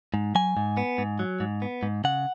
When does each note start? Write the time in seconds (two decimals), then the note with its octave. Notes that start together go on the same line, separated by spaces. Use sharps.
0.14 G#2
0.35 F#3 G#5
0.57 G#2
0.77 B3
0.98 G#2
1.19 F#3
1.40 G#2
1.62 B3
1.83 G#2
2.04 C#3 F#5